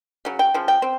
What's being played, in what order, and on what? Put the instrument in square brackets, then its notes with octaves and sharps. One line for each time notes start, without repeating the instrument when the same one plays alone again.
[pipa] C#3 F#3
G5
C#3 F3
G5
C4